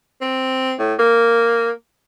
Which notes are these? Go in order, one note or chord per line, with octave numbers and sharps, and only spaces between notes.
C4
A2
A#3